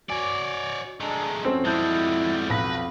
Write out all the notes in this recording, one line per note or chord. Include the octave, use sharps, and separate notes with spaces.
F#4 C#5 D5 G#5
G#3 A3 D4 D#5 A#5
F2 C4 C#4 F#4 A4 C5
G3 G#3 E4 A5 G6
B1 B4 B5 A#6